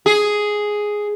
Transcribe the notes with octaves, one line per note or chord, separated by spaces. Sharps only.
G#4